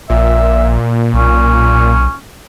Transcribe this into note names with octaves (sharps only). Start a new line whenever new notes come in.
A#1 A#2 E5
B1 C#4